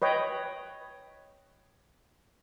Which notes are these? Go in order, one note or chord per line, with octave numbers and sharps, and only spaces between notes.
B4 C#5 D#5 G5